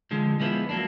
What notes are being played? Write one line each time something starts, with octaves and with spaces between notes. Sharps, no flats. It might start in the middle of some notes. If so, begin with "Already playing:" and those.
D3 F3 G#3
F3 G#3 B3 E4
F#3 A#3 D4